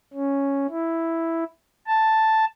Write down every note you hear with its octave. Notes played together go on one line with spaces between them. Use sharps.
C#4
E4
A5